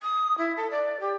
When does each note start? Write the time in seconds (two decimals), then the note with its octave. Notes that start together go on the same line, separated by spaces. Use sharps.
0.02 D#6
0.37 E4
0.56 A4
0.70 D5
1.00 G4